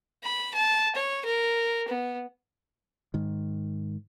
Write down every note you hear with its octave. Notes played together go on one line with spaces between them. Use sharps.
B5
A5
C#5
A#4
B3
G#2 D#3